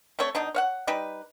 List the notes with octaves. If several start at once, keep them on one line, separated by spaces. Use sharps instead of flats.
A3 C4 C#5 D5
B2 D4 D#4
C#5 F5 F#5
G3 D#4 G4 B4